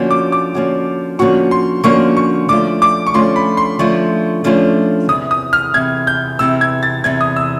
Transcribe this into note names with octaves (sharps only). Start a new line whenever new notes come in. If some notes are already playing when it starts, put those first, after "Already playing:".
Already playing: D3 F3 A#3 C#4 F#4
D6
D6
D3 F3 A#3 C#4 F#4
D3 F3 A#3 C#4 F#4 C#6
C6
D3 F3 A#3 C#4 F#4 C#6
C#6
D3 F3 A3 C#4 F4 D6
D6
C#6
D3 F3 A3 C#4 F4 C6
B5
C6
D3 F3 A3 C#4 F4 C#6
D3 F3 A3 C#4 F4
E2 C3 E3 D#6
D#6
F6
E2 C3 E3 G#6
G6
E2 C3 E3 E6
G#6
A6
E2 C3 E3 G#6
D#6
E6